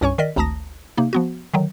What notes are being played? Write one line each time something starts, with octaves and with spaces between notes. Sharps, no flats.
C2 G2 C#4 C#5 G#5 C#6
D#3 A#4 D5 D#5 B6
G#1 D2 A5 A#5 D#6 A#6
C3 A#3 D#4
F3 B3 F#4
D3 D#3 F#3